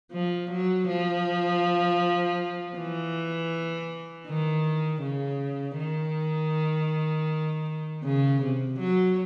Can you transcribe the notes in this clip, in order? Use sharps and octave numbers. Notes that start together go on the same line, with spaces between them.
F3
F#3
F3
E3
D#3
C#3
D#3
C#3
C3
F#3